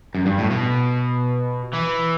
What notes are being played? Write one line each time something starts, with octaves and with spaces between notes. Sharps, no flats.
F#2
G2
A2
B2
E3